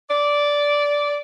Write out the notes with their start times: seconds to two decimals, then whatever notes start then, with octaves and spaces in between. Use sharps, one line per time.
0.10 D5